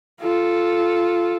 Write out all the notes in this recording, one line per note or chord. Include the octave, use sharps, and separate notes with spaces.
F4 A4